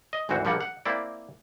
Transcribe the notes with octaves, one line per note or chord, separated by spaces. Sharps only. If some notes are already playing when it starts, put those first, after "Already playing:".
D#5
G#1 D2 E3 C4 F#4
A#1 F3 G3 A#3 F#5
F#5
A#3 C4 E4 D5